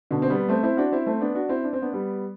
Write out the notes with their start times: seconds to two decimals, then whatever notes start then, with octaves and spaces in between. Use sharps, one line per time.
0.11 B2 D3
0.22 C4
0.30 G3 B3
0.49 A3 C4
0.63 C4 E4
0.77 D4 F#4
0.92 C4 E4
1.06 A3 C4
1.21 B3 D4
1.35 D4 F#4
1.49 C4 E4
1.64 D4
1.73 C4
1.82 B3 D4
1.92 G3 B3